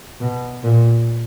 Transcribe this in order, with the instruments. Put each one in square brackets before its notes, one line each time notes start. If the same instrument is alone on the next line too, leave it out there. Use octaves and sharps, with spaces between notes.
[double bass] B2
A#2